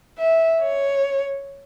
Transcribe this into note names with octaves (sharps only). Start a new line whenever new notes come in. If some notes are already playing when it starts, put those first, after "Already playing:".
E5
C#5